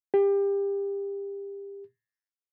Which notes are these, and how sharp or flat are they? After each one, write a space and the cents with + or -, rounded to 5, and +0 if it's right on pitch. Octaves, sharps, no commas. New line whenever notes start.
G4 +25